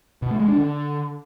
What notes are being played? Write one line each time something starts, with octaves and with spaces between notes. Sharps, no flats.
B2
A3
G#3
D4
D3